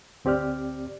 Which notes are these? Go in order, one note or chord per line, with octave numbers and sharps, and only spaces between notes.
D2 C4 G4 D5 F6